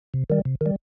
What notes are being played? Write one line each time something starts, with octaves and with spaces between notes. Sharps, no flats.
C3
D#3 G3
C3
D#3 G3